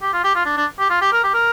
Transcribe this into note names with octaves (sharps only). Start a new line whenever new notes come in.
G4
F4
G4
F4
D4
D4
G4
F4
G4
A#4
G4
A#4